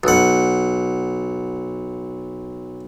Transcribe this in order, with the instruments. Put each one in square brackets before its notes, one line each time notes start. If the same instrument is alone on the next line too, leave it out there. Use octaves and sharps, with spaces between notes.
[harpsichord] B1 F#5